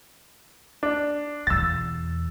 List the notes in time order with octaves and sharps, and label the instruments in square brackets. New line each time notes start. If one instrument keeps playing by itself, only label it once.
[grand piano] D4
[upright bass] E2 B2 [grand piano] E6 A6